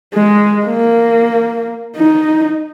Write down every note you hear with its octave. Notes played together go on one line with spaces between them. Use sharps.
G#3
A#3
D#4